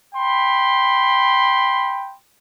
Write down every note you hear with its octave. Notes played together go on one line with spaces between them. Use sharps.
G5 B5 C6